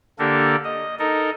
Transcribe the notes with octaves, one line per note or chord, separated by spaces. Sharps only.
D3 A#3 D4 G4 A4 A#4
D#5
D#4 A4 A#4 D#5